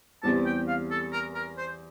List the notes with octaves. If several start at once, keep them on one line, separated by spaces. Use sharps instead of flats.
E2 E3 G3 C4 G4 A5
G5
F5
A4
A#4
A#4
C5